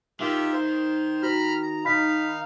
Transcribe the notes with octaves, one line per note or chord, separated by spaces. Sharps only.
D#3 F4 G4 E5
C5
F#4 A#5 B5 F6
A#5
D#4 F5 B5 B6